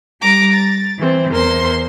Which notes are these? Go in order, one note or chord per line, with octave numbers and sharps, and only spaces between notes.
G3 A#5 D6
A6
E3 C4
E2 A#4 C5 C6